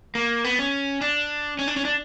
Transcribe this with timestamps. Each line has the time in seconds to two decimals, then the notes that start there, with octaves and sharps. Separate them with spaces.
0.15 A#3
0.44 B3
0.59 C#4
1.01 D4
1.59 C#4
1.68 D4
1.76 C#4
1.85 D4